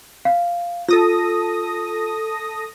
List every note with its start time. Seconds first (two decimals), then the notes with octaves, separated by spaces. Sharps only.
0.25 F5
0.88 F4 A4 D#6 A#6